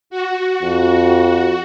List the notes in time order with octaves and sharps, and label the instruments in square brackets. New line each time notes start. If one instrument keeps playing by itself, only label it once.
[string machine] F#4
[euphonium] F2